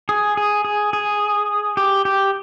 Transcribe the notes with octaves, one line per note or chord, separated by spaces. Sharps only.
G#4
G#4
G#4
G#4
G4
G4